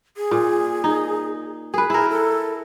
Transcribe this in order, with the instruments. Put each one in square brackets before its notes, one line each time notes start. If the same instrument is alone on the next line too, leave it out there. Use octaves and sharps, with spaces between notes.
[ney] G#4
[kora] A#2
D#4
[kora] G#4 B4 [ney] A#4
[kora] E4 A#4 [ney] G#4
[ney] A4